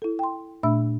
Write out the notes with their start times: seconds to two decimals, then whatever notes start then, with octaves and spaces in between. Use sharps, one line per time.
0.02 E4 A4
0.19 G5 C6
0.63 A#2 A3 D4 E5 B5 E6